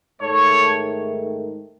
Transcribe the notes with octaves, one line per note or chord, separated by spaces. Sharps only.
G#2 D#3 A3 A4 C#5